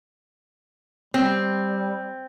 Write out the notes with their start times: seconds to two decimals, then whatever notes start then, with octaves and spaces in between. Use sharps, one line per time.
1.14 G3 C4